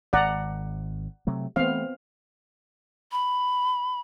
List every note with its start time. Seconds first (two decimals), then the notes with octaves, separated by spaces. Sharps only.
0.13 G#1 D5 F#5 A#5
1.27 C3 F#3 A3
1.56 E3 A3 B3 C4 F5
3.12 B5